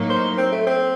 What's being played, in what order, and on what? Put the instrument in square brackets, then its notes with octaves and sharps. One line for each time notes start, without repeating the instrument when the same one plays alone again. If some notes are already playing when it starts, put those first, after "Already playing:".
Already playing: [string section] A2 F#3 A#3 D#4
[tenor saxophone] C5
C4
A3
C4